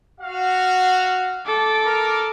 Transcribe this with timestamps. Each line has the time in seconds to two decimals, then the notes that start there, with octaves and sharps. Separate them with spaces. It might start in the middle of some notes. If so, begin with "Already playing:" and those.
0.20 F#4 F5
1.46 A4 D6
1.84 A#4